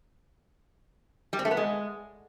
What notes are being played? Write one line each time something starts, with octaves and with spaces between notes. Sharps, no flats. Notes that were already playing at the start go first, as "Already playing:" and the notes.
G3
C4
A3
B3
G#3